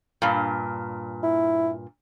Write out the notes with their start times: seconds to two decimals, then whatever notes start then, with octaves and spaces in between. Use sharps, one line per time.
0.22 G2 A#2
1.23 E4